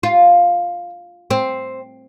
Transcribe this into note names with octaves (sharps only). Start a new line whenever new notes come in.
F4
C4